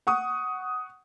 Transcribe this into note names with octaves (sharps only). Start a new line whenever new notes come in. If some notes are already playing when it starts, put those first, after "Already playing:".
F#5 C#6 D#6